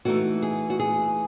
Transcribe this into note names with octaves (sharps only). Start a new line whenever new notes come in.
E3 A3 D#4 F#4
G#4
F#4
G#4